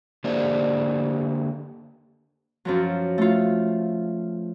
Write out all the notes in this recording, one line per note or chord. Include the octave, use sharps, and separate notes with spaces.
D3 A#3 G4 C5 D5
F#2 F3 F#3
A3 F4